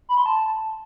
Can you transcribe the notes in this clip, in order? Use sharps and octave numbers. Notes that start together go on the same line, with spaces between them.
B5
C6
A5